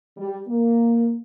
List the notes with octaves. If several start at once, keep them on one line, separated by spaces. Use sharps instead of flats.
G3
A#3